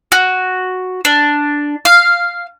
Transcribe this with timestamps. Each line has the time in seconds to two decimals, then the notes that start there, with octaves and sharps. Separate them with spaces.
0.12 F#4
1.05 D4
1.85 F5